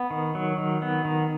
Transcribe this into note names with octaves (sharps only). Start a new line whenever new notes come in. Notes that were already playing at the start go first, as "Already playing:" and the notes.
Already playing: B3
D#3
F#3
D#3
B3
D#3